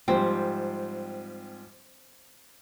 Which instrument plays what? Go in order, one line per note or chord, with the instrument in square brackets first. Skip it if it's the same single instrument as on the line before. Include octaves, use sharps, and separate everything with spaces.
[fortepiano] G#2 F3 G3 [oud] C4